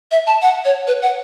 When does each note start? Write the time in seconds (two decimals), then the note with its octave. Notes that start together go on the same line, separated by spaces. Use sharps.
0.11 E5
0.27 A5
0.42 F#5
0.65 C#5
0.87 B4
1.02 F#5